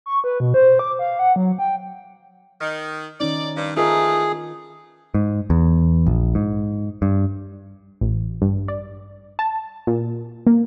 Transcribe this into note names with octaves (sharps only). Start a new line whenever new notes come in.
C#6
B4
B2
C5
D6
F5
F#5
F#3
G5
D#3
D#3 C#4 D#4 D5
G2
E3 F3 A3 F4 G#4 A#4 D#5
G#2
E2
A#1
G#2
G2
A1
G2
D5
A5
A#2
A#3